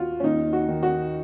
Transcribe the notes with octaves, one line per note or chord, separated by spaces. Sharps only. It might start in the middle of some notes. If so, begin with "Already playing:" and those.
Already playing: D#2 F4 F#4
C#4
D#2 D#4
F#4
D#3
F#4